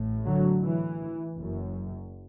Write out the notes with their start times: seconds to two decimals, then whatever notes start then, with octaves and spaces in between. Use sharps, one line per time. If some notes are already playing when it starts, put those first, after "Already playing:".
Already playing: A1 A2
0.26 D3 F#3
0.63 E3
1.38 F#1 F#2